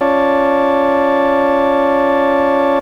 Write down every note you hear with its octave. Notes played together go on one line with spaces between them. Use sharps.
C#4 F4 C#5 D5 A5